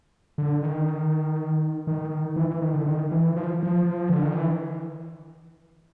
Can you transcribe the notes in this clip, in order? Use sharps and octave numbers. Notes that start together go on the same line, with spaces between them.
D3
D#3
D#3
E3
E3
D#3
D3
D#3
E3
F3
F3
D3
D#3
E3